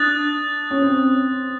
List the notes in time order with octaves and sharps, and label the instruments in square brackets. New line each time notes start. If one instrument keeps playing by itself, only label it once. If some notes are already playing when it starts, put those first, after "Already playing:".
Already playing: [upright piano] D4 [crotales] D#6 F#6 A6
[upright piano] C#4
C4